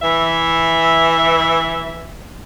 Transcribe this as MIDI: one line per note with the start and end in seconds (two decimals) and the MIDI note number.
0.02 2.15 52
0.02 2.15 76